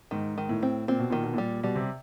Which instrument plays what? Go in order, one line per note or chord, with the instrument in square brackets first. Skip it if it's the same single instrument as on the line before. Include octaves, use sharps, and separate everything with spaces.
[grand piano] G#2 [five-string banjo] D#3
[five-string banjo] D#3
[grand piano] A2
[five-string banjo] C4
[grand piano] A#2 [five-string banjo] C4
[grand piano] B2
[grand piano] A#2 [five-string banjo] D#3
[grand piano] B2
[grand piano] A#2 [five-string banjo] G3
[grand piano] B2 [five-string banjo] G3
[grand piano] C3